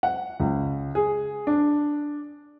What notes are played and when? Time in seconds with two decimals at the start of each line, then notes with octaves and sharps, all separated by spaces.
0.03 F#5
0.40 C#2
0.95 G#4
1.47 D4